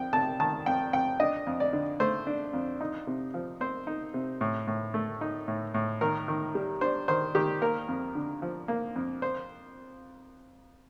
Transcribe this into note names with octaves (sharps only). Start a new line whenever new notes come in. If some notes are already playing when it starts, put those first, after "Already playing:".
Already playing: F2 G5
C3 A5
D#3 A5
F2 G5
F2 G5
D4 D#5
F2
D5
D3
A3 C5
D4
F2
D#4
C3
F3
C4 C5
D#4
C3
A2
A2
A3
D#4
A2
A2
D#3 A#4
D#3
G3
D4 C5
D#3 C5
D#3 G4
A#3 A#4
F2
D3
F3
A#3
F2
C5